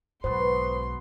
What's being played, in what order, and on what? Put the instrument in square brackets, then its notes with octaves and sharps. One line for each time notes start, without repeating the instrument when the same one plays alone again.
[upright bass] B1 G#2 [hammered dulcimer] B2 B3 F#4 [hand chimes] C5 [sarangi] C6